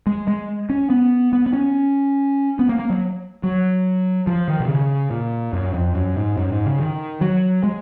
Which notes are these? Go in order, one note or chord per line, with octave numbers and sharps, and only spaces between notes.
G#3
G#3
C#4
B3
B3
B3
C#4
B3
A#3
A#3
F#3
F#3
F3
D#3
B2
C#3
A#2
F#2
F2
F#2
G#2
F#2
G#2
C#3
D#3
F#3
G#3